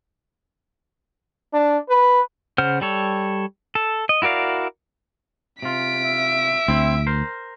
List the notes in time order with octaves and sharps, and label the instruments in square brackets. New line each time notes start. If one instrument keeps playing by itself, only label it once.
[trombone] D4
B4
[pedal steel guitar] C#3 C5 F#5 F6
G3 A4 C#5
A4
D#5
E4 F#4 A#4 D5 F5
[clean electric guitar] C3 F4 [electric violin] B6 D7
[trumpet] E5
[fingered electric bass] D2 [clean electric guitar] C4 E4
[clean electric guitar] A#4 C5